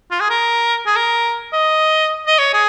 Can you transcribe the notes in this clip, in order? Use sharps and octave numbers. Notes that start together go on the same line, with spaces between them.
F4
G#4
A#4
G#4
A#4
D#5
D#5
C#5
G#4